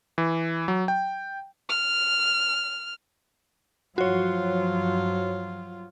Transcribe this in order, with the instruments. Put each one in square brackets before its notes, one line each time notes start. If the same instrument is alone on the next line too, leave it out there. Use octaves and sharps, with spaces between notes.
[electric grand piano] E3
F#3
G5
[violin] F6
[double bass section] G2 F3 [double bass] F#3 [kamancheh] F4 [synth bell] F#4 C#5